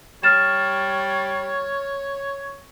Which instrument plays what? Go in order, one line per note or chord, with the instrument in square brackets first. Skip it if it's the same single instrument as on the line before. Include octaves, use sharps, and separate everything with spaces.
[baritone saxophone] G3 [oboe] C#5 [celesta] F6 A6 E7